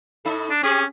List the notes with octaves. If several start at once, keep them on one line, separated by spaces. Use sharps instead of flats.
A2 D#4 A4
D4
C4 C#4 G4 G#4